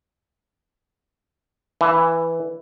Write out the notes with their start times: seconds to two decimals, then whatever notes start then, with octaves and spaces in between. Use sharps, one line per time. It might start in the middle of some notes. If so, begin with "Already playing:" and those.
1.81 E3